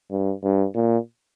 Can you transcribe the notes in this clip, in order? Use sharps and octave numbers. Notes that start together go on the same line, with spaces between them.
G2
G2
A#2